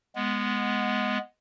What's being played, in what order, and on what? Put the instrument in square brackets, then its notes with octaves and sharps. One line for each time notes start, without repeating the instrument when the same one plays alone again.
[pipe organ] G#3 B3